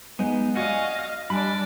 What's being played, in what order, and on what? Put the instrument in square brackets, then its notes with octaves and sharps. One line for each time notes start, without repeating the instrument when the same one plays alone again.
[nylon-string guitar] G#3 [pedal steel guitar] B3 D#4
[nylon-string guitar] F#4 D5 [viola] D#5 F5 [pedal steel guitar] F#5 G#5 C#6
[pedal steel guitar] F6
[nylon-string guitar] G3 [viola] D4 D5 [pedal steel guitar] D#5 G#5 B5